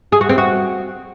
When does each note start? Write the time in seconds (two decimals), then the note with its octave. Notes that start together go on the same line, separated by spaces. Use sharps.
0.12 G#4
0.21 F#4
0.29 C4
0.38 F#4